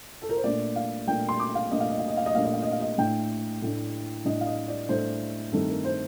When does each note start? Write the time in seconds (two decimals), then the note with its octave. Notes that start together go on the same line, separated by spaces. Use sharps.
0.22 A4
0.29 A#4
0.37 C5
0.44 A#2 A3 D4 D5
0.76 F5
1.07 A#2 A3 D4 G5
1.29 C6
1.40 D6
1.55 F5
1.71 A#2 A3 D4 D#5
1.80 F5
1.89 D#5
1.99 F5
2.08 D#5
2.17 F5
2.26 D#5
2.35 A#2 A3 D4 F5
2.44 D#5
2.53 F5
2.62 D#5
2.72 F5
2.81 D#5
2.98 A2 A3 D4 G5
3.62 A2 A3 D4
4.25 A2 A3 D4 D#5
4.41 F5
4.47 D#5
4.68 D5
4.89 A2 A3 D4 C5
5.52 G2 D#3 A3 C4 D#4 A4
5.68 A#4
5.85 C5